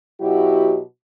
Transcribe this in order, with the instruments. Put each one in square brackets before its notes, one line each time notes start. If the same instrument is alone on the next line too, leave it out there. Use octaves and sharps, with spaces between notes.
[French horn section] B2 F#3 E4 F#4 G4